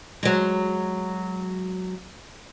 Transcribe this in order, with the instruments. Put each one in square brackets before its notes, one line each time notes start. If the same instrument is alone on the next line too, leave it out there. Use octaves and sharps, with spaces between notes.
[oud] F#3 G#3